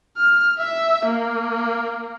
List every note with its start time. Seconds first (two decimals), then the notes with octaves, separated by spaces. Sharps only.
0.17 F6
0.58 E5
1.05 A#3